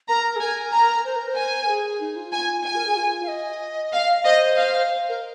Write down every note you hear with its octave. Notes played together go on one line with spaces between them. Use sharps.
A#4 A#5
G#4
A#4 G#5
A#5
C5
A#4
C5
G#5
A#4
G#4
D#4
F4
G#5
G#5
A#4
G#4
F4
F5
D#5
F5
C5 D#5
F5
C5
A#4